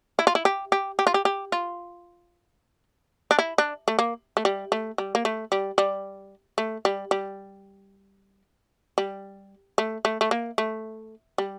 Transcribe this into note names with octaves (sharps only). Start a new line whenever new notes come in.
E4
F4
E4
G4
G4
G4
F4
G4
G4
F4
D4
E4
D4
A3
A#3
A3
G3
A3
G3
A#3
A3
G3
G3
A3
G3
G3
G3
A3
A3
A3
A#3
A3
G3